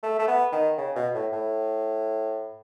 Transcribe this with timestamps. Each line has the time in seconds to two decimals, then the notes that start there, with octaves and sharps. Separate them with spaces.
0.03 A3
0.19 A3
0.28 B3
0.52 D#3
0.78 C#3
0.96 B2
1.14 A2
1.32 A2